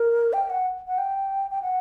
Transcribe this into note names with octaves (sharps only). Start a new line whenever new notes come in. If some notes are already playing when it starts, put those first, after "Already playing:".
Already playing: A#4
G5
F#5
F#5
G5
G5
F#5